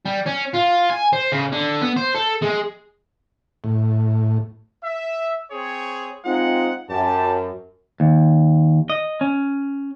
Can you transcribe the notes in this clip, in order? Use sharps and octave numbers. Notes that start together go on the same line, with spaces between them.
G3
C#4
F4
G#5
C5
C#3
D3
B3
C5
A4
G#3
A2
E5
C4 G#4 C#5
G#3 C4 D#4 F4 F#5
F#2 G4 A5
D#2
D#5
C#4